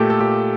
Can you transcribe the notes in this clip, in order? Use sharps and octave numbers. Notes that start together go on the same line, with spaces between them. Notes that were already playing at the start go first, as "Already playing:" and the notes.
Already playing: A#2 A3 G4 A4
A4
A#2 G4